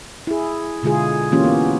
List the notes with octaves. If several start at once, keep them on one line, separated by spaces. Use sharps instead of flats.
E4 G#4
B2 D3 G#3 F4 G#4
E3 A#3 C#4 F4 G4
B3